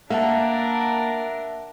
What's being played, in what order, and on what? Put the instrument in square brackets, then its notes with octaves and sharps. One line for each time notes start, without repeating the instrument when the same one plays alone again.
[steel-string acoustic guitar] A#3 [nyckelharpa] D4 A#4 [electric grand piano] E5 F#5 A5